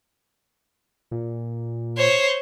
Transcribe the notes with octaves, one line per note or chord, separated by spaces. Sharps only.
A#2
C5 C#5